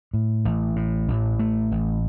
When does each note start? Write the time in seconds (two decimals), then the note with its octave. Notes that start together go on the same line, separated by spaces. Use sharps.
0.14 A2
0.45 A1
0.76 A2
1.08 A1
1.39 A3
1.71 A1